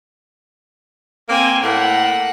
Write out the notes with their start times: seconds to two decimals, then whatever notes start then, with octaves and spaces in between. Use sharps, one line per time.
1.29 A#3 C4 G#5
1.62 A2 A#3 F#5